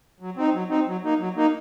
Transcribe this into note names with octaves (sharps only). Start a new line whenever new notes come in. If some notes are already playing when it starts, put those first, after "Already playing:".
F#3
C4 D#4
F#3
C4 D#4
F#3
A#3 D#4
F#3
A#3 D#4